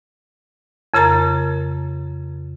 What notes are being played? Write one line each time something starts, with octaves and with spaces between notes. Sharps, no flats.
F2 C#3 A#4 A#5 A6